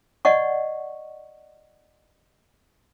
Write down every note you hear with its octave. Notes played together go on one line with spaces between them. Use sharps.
D5 D#5 F#5 C#6